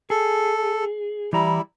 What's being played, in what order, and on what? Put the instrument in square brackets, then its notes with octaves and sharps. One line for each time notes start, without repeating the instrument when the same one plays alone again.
[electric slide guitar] G#4 [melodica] A4
[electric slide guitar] E3 A#5 [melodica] G3 E4